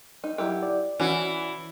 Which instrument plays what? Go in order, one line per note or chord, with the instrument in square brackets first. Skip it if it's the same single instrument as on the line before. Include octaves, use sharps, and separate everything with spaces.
[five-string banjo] D#4
F#3 E4 G4
[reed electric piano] D5
[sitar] E3 [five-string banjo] C#4 F#4